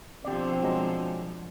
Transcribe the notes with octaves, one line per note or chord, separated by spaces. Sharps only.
B2 D3 F3 C4 G4 D5
F#3 G#3 A#5